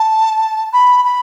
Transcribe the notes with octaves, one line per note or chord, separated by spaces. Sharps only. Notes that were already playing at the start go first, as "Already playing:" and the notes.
Already playing: A5
B5
B5